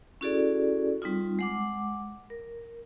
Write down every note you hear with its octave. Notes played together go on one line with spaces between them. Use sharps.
C#4 E4 F#4 G#4 A4 D5
G3 C4 D#4 F4
G#3 F#5 D6
A#4